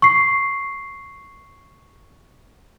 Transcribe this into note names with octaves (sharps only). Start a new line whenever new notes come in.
C#6 C7